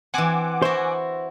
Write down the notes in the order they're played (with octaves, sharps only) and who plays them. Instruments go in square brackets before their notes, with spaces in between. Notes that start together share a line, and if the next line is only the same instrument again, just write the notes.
[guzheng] E3 C4 [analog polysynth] F#5 G#5 D6
[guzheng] E4 F#4 [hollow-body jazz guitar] C5